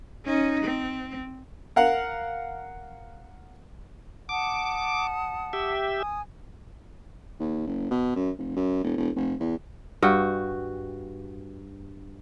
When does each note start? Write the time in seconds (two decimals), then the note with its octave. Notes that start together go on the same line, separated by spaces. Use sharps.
0.25 C#4 D#4
0.64 C4
1.76 A#4 F5 F#5
4.29 F#5 A5 D6 D#6
5.53 G4 E5
5.97 G#5 D#6
7.40 D#2
7.67 F#1
7.91 B2
8.16 F#2
8.38 F1
8.56 F#2
8.84 E1
8.97 E1
9.16 F1
9.40 E2
10.02 G2 F#4 G5